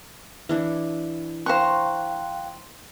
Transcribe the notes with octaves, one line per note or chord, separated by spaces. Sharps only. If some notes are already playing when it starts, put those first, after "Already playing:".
E3 D4 E4
C5 F5 G5 A#5 C#6 F#6